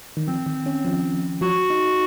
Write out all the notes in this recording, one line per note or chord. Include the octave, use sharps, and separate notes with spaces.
D#3
F3 C4
D#3
C#4
F3
F3 F#4
D#4